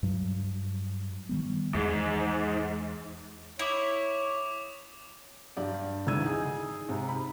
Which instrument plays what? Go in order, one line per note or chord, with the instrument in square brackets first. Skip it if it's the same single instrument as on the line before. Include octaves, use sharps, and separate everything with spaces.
[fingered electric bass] G2 F#3
[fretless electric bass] D#3 G3 B3
[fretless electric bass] E2 [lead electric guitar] G#2
[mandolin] E4 [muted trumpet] C#5 [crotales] D6 D#6 F7
[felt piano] G2 G4 D5
G#1 D2 E3 E6 G#6 D#7
D#4 G#4 G#5
G#2 C3
B5